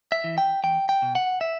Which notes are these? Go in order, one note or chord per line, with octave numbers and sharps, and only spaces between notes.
E5
E3
G5
E2 G5
G5
B2
F#5
E5